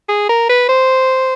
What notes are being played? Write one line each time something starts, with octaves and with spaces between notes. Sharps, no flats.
G#4
A#4
B4
C5